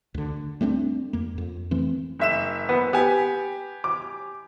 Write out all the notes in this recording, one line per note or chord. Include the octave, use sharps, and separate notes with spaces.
D2 D3
G3 A3 C4 D4
F2 A#3
F2
E3 A3 C4
F#1 E5 E7
B3
B3 G4 G#5
D6